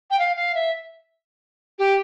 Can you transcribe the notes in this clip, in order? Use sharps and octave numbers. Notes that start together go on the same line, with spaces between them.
G5
F5
F5
E5
G4